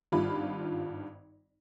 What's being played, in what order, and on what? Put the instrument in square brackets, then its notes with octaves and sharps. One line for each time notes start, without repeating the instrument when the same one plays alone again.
[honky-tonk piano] G#1 G2 F4 B5